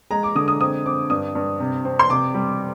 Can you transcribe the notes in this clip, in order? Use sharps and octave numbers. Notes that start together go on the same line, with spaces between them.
G#3 A#5
D6
D3 D#6
D#6
C4 D#6
C4 D6
G2 D#6
G2
C3
C4
C6
C3 D6
G3